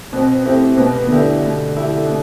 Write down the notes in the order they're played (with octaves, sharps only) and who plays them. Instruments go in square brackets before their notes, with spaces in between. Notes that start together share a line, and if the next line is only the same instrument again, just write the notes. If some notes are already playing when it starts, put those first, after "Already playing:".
[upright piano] B2 [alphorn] C4
[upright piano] A3 E4 G4 [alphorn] C4
[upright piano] B2 [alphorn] B3
[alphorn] D3 [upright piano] A3 E4 G4
[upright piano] B2
A3 E4 G4
B2